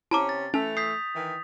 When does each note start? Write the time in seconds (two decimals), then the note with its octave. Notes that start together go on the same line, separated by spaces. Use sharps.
0.11 C3 C#4 E4 A5 A#5 D6
0.29 A6
0.54 E3 A3 C#4 A5 F7
0.77 D#6 G6 B6 C7
1.16 D#3 E3